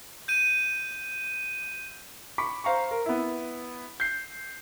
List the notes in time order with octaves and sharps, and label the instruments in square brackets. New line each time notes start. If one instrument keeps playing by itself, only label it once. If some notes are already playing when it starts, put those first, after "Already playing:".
[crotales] G6 D#7
[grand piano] B5 C#6 D6 B6
C5 F5 A#5 C#6
A#4
B3 E4
G6 C7